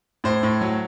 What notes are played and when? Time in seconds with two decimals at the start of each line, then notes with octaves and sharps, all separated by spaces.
0.24 A2 C5
0.43 A2
0.61 F#3